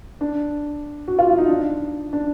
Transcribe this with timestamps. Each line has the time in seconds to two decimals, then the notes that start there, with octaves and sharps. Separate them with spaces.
0.21 D4
1.08 F#4
1.19 F4
1.28 E4
1.38 D#4
1.48 D4
2.13 D4